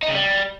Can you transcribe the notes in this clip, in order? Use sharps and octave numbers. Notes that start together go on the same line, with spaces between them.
D#4
C#3
G3